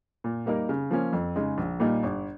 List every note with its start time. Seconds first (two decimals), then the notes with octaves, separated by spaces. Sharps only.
0.24 A#2
0.46 G3 A#3 D#4 A#4
0.69 C#3
0.91 F3 A#3 C#4
1.13 F2
1.36 C#3 G#3 D#4
1.58 A#1
1.80 A#2 G3 A#3 D#4
2.03 G1